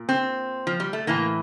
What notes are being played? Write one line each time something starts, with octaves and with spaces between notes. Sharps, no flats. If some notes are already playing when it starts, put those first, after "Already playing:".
Already playing: A#2
C4
F3
G3
A3
A2 E3 A#3